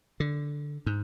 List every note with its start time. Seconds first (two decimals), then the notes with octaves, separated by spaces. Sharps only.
0.20 D3
0.86 G#2